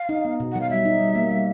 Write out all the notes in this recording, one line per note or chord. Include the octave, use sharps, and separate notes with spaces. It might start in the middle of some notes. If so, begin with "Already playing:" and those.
Already playing: F5
D#4
B3
B2
F#3 F#5
F5
G3 E5
D#4
G3
A#3
G3